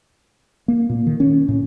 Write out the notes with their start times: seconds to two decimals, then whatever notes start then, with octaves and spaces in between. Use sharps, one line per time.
0.68 A#3
0.89 A#2
1.06 D#3
1.20 C#4
1.48 A2